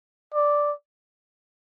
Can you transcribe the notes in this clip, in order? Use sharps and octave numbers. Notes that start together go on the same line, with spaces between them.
D5